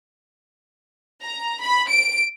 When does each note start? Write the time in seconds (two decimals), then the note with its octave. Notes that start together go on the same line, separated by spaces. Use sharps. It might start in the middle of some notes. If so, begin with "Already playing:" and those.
1.23 A#5
1.61 B5
1.90 D7